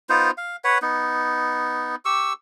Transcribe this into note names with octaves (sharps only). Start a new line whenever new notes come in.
B3 D#4 F4 C5
F5
B4 C#5 F#5
B3 D#4
G4 C#6 E6